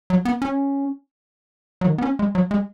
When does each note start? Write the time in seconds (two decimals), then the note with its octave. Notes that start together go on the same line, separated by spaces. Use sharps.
0.10 F#3
0.25 B3
0.42 C#4
1.81 F#3
1.86 D#3
1.98 B3
2.02 C#4
2.19 G#3
2.35 F#3
2.51 G#3